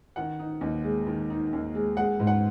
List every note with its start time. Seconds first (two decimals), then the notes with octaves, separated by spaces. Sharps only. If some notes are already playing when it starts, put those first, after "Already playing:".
0.16 D#3 F#5
0.39 D#4
0.61 D#2
0.84 G#3
1.07 D#3
1.30 D#4
1.53 D#2
1.75 G#3
1.97 G#3 F#5
2.19 G#2
2.27 F#5